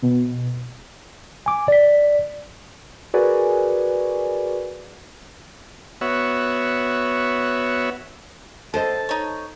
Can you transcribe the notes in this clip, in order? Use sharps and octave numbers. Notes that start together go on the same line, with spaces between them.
B2
G#5 D6
D5 B6
F#4 G#4 A#4 B4 D5 G#5
B3 F#4 C#5 E5
D3 A4 C5 D#5 A5
D#4 C#5